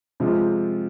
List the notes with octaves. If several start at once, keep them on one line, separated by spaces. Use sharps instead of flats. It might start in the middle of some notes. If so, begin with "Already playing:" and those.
C3 F3 G#3 C4 F4